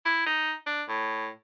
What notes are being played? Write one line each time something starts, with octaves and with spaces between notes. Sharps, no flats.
E4
D#4
D4
A2